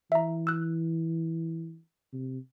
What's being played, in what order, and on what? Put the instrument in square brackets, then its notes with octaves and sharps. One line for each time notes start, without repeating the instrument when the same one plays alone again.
[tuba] E3 [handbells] E5 A#5
[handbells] E6 F#6
[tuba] C3